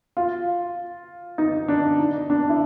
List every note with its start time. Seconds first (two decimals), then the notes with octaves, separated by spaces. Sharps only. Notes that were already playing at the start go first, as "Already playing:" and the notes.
0.17 F4
1.38 D#4
1.68 D4
1.99 D#4
2.30 D4
2.50 E4